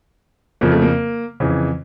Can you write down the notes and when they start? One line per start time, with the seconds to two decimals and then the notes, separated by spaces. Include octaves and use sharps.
0.61 F2 C#3 F3 A#3
0.72 A3
0.82 A#3
1.40 F2 C#3 E3